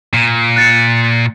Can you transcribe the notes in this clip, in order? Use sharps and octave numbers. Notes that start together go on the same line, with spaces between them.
A#2
F#6 A6 C#7